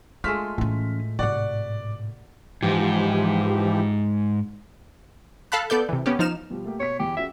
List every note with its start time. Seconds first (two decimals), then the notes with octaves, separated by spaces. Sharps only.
0.24 G#3 A3 D4 F4 F6 B6
0.58 A2 E3 C#4
1.19 G#2 C3 F#4 D5 F#5
2.63 G#2 E3 F3 G4
5.52 A4 F5 A5 B5 F#6
5.70 B3 A4 D5 G6
5.89 C3 E3
6.06 B3 C#4 G4
6.19 F3 D#4 F6 E7
6.50 B2 F3 G3
6.65 A3 A#3 G4
6.80 B2 C#5 B6
7.00 E2 G4
7.17 C#4 F#4 G#4 E5